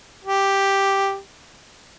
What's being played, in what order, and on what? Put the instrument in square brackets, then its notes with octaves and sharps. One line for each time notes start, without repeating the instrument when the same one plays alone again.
[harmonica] G4